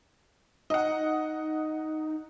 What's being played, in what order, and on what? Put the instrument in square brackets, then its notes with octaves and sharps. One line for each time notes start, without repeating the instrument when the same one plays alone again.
[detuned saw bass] D#4 [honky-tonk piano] D#5 F#5